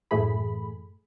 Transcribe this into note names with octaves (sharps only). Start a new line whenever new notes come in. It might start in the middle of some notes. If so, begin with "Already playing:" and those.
F#2 A2 E3 A3 G#4 B5